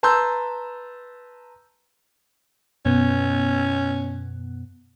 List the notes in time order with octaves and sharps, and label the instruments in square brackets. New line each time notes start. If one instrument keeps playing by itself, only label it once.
[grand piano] B4 A5 A#5 C6 E6 G6
[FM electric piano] F#2 B2 B3 [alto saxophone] C#4